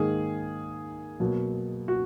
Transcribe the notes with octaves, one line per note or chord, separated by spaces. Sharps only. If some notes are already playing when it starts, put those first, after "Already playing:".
Already playing: G#2 D#3 A#3 G#4
B2 F#3 A#3
F#4